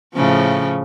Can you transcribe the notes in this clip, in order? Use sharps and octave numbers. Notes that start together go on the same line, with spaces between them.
A2 C#3 F3